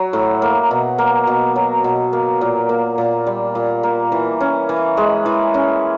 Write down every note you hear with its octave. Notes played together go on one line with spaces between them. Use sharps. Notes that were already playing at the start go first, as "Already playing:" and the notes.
Already playing: F#3
A2
A#3
B2
A#3
B2
F#3
B2
A#3
A#2
A#3
A#2
G3
A#2
A#3
E3
C#4
E3
G#3
E3
C#4